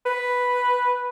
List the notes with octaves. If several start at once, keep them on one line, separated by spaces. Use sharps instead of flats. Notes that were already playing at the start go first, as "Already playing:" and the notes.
B4